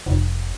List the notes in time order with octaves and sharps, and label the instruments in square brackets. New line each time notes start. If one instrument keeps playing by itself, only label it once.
[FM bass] F1